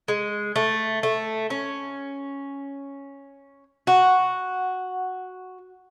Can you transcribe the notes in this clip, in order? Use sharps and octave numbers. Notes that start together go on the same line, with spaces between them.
G#3
A3
A3
C#4
F#4